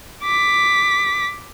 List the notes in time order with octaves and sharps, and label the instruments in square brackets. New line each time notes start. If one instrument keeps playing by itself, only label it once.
[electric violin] D6 B6